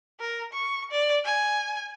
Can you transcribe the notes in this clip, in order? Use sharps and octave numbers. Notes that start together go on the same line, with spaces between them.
A#4
C#6
D5
G#5